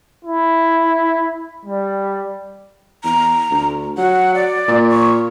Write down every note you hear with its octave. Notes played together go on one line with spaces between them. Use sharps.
E4
G3
E2 A#5
D2
F#3 F#5
D5
A#2
C#6